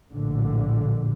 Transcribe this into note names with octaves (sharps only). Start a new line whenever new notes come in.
A#1 A2 D3